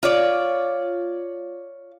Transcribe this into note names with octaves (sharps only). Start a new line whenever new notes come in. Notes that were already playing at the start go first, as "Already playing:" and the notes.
F4 C#5 D5